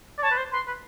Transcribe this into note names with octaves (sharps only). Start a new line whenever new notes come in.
D5
C#5 A5
B4
C5
B4 C6
B4